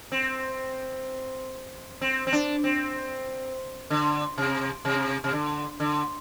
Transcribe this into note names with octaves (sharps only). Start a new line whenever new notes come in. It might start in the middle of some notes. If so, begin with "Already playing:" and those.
C4
C4
C4
D4
C4
D3
C3
C3
C3
D3
D3